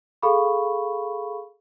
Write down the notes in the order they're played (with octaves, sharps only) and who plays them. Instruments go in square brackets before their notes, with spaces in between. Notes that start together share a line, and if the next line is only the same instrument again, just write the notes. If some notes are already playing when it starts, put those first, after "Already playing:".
[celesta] G#4 A4 F5 B5 C#6